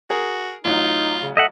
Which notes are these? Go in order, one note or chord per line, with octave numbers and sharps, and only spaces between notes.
F#4 G#4 A#4
A1 F#3 D#4 F4
C#3
A4 D#5 E5 F#5